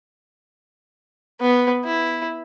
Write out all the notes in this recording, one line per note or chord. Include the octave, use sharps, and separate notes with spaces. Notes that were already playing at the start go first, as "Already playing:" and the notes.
B3
E4